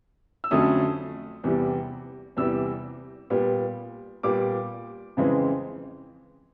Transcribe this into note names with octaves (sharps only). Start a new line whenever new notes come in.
E6
F2 D3 F#3 A3 C#4 D#6
E2 C3 E3 G3
E2 C3 E3 G3 E6
A#2 G3 B3
A#2 G3 B3 D6
F2 C#3 E3 G#3 C4